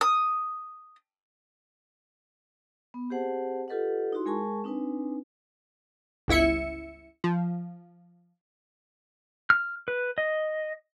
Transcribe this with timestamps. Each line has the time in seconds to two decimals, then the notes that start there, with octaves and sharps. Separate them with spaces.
0.01 D#6
2.94 B3
3.10 C4 G4 G#4 C5 F#5 A5
3.68 F4 G4 A4 B4 D#5 F#5
4.13 D#4 E4 F#4 C6
4.26 G#3 G#4 A#4 G#5 A5 C#6
4.64 C4 D4 D#4 B4 G#5
6.28 G1 C#2 E4 E5 C#7
7.24 F3
9.50 F6
9.88 B4
10.18 D#5